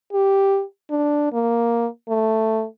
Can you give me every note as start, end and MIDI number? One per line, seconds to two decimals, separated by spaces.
0.13 0.63 67
0.90 1.30 62
1.33 1.87 58
2.09 2.65 57